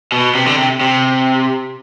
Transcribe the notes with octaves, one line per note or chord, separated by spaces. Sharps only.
B2
C3
D3
C3
C3